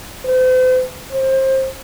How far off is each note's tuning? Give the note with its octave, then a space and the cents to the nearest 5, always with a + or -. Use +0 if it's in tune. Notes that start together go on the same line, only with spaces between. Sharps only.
C5 -40
C5 +25